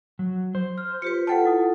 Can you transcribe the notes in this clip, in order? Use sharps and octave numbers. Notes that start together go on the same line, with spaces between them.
F#3
C5
F6
F4 G4 B4 C#7
F4 A4 F#5 G5 A5
E4 F#5 D#6